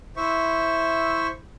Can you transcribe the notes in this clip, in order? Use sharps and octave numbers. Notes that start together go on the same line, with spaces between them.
E4 C5 E5 C#6